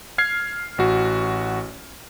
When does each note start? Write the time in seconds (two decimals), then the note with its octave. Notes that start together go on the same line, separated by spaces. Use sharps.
0.18 F6 G#6 C7
0.78 A1 F#4